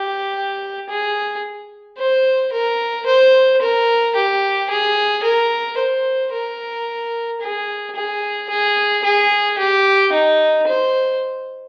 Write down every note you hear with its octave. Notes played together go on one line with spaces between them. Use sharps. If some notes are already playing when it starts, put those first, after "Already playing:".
Already playing: G4
G#4
C5
A#4
C5
A#4
G4
G#4
A#4
C5
A#4
G#4
G#4
G#4
G#4
G4
D#4
C5